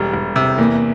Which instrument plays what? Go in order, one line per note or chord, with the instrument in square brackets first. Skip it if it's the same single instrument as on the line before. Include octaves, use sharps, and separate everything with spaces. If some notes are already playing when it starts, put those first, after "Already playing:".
Already playing: [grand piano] E1 G3 [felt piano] G4 A4
[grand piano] E1
C3
[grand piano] E2 [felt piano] A#3